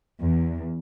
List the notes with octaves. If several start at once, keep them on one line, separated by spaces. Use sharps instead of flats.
E2